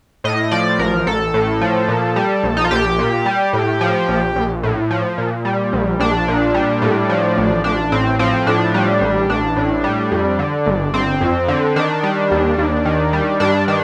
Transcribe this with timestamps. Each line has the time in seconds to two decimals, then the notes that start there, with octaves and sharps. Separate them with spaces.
0.24 A2 D#5
0.51 F3 D5
0.79 A1 A#4
1.06 A1 A4
1.34 A2
1.61 F3
1.88 A#2
2.16 G3
2.44 A#1
2.57 D#4
2.64 F4
2.71 A#1 G4
2.99 A#2
3.26 G3
3.53 A2
3.81 F3
4.09 A#1
4.36 A#1
4.63 A2
4.91 F3
5.18 A#2
5.45 G3
5.73 A#1
5.99 A#1 D4
6.28 A#2
6.54 G3
6.82 A2
7.09 F3
7.37 A1
7.64 A1 D4
7.92 A2 C4
8.19 F3 C4
8.46 A2 D4
8.74 G3
9.01 A1
9.29 A1 D4
9.56 A2
9.84 G3
10.11 F2
10.39 D3
10.66 G1
10.93 G1 C4
11.21 F2
11.48 D3
11.76 D#3 D4
12.03 G3
12.31 D#2
12.58 D#2
12.85 D#3
13.13 G3
13.40 G2 D4
13.68 D#3 D4